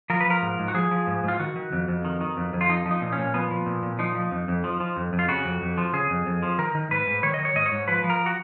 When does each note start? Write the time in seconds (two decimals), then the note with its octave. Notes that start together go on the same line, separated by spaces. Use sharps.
0.10 F3 A#4
0.20 B4
0.26 F3 A#4
0.42 G#2
0.59 G#2
0.68 F#4
0.74 F3 G#4
0.91 F3
1.07 G#2
1.23 G#2 F4
1.40 D#3 F#4
1.56 D#3
1.72 F2
1.88 F2
2.05 D#3
2.21 D#3
2.37 F2
2.53 F2
2.61 F4
2.69 F3 D#4
2.86 F3
2.91 D#4
3.02 A#2
3.12 C#4
3.18 A#2
3.34 F3 B3
3.51 F3
3.66 A#2
3.83 A#2
3.99 F3 D#4
4.15 F3
4.31 F2
4.48 F2
4.64 F3
4.80 F3
4.96 F2
5.13 F2
5.19 F4
5.28 C#3 F#4
5.45 F2
5.62 F2
5.78 F3
5.93 C#3 G#4
6.10 F2
6.26 F2
6.43 F3
6.58 D#3 A#4
6.75 D#3
6.91 G#2 B4
7.07 G#2
7.23 D#3 C#5
7.34 D#5
7.39 D#3
7.45 C#5
7.56 G#2 D#5
7.66 C#5
7.72 G#2
7.88 F3 B4
8.04 F3
8.10 A#4
8.26 F#4